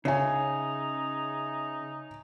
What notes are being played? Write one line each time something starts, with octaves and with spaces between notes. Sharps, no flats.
C#3 D#4 C#5 E5 G#5